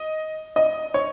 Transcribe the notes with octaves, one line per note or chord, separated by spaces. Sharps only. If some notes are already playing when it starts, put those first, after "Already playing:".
Already playing: D#5
D#5
C#5